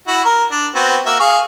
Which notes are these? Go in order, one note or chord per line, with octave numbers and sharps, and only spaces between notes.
E4 F#4
A#4
D4
B3 C4 F#4
A#3 F#4 E5
G#4 F5 C#6